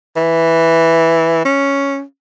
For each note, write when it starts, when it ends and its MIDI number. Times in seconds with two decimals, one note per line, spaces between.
0.16 1.42 52
1.45 2.01 61